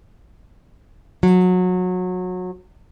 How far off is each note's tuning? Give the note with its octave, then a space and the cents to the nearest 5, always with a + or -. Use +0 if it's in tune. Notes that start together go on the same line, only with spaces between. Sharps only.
F#3 -25